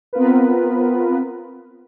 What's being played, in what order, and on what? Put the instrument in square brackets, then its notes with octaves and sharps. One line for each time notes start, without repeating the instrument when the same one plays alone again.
[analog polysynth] B3 C4 F4 A#4 B4